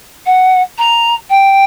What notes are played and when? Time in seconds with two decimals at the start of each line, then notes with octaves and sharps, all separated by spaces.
0.26 F#5
0.78 A#5
1.30 G5